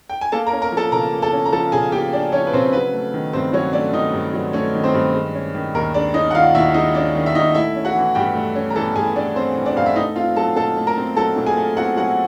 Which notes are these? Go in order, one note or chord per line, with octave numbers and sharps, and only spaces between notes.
G5
G#5
A#3 A4 A5
A#4 A#5
C#4
A#4 A#5
F3
A4 A5
C#3 A#4 A#5
A#3
A4 A5
C#4
A#5
F3 A4 A5
C#3 G#4 G#5
A#3 G4 G5
C#4 D4 D5
F3 C#4 C#5
B4
C#3 C4 C5
F#3 B4
A3
D#3
G2 C4 C5
F#3 C#4 C#5
A3 D4 D5
D#3 D#4 D#5
G2
F#3
A3 C#4 C#5
D#3
C4 C5
G2
G#3
C#4
D#3
D#2 A#4
G#3 D4 D5
C#4 D#4 D#5
F#5
D#3 F4 F5
D#2 E4 E5
G#3 D#4 D#5
C#4 D4 D5
D#3
E5
D#2 D#4 D#5
A3 E4 E5
C#4
F#4 F#5
E3
G2 G4 G5
A3
C#4
A#5
E3 A4 A5
G2 G#4 G#5
A3 D4 D5
C4 C#4 C5
E3
D4 D5
G2 F5
E5
A3 D#4 D#5
C4 F4 F5
F#3 A4 A5
A#2 A4 A5
A3
A#4 A#5
C4
F#3 A4 A5
A#2
G#4 G#5
A3
C4 F#4 F#5
F#3 F#4 F#5